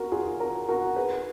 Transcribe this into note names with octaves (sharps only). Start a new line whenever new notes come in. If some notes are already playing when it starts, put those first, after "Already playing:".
Already playing: F#4 A#4
F4 G#4
F#4 A#4
F#4 A#4
G#4 B4